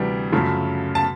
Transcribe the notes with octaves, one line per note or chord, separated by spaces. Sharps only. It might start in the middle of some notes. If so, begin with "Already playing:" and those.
Already playing: D2 C3 E3 G3
F#2 C#3 F3 A3
A5